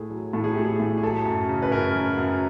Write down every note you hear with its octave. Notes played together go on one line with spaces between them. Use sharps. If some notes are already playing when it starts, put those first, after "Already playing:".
Already playing: A2 A3 G#4
F#3
A2 A4
G#4
A3 G4
G#4
A2
G#4
F#3 A4
F#2
C#3
B4
F#2 A#4
F#3
F#2